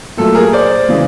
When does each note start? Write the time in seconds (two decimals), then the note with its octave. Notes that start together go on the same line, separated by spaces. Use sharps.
0.17 A#2 F#3 A3 A4
0.35 G#4 A#4
0.53 C5 D5
0.89 C#3 E3 G#3